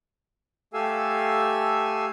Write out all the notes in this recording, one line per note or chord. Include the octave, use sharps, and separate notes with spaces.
A3 G4 A4 F5 G#5 E6